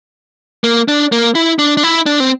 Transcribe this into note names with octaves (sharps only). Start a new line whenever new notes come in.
A#3
D4
A#3
E4
D4
D4
E4
D4
C4